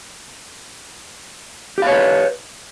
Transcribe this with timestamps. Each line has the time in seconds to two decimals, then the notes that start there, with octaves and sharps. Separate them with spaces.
1.78 G4
1.82 F5
1.87 C#5
1.91 B4